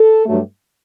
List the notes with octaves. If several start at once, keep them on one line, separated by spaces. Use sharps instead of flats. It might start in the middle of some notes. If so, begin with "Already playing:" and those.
Already playing: A4
G2 F#3 A3